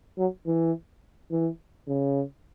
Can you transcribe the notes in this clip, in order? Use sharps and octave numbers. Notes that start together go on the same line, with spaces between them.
F#3
E3
E3
C#3